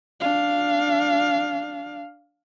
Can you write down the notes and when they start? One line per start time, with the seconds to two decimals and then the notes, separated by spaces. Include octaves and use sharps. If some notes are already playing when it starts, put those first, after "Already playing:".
0.21 D4 F5